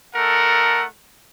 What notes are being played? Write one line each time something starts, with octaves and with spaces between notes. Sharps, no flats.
A3 D#4 A4 A#4 F#5